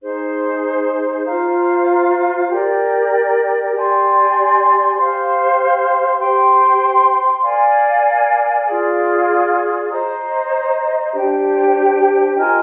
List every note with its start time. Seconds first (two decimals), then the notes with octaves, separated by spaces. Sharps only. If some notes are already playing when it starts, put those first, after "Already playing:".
0.02 D#4 G#4 C5
1.25 F4 C5 F5 A#5
2.49 G4 A#4 D5
3.72 G4 D5 G#5 C6
4.95 G4 C5 F5 C6
6.19 G4 C5 G5 C6
7.43 A#4 D5 F5 G#5
8.66 F4 G#4 D5
9.90 C5 D#5 A#5
11.13 D4 G4 C5 G5
12.36 F4 A#4 D#5 G#5